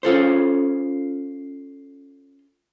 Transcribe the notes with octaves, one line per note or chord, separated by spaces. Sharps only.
C#4 F4 A4 C5